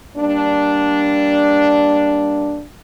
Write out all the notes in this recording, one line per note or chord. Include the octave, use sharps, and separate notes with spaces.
G3 A#3 D4